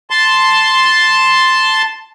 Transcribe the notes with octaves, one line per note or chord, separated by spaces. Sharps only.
A5 C6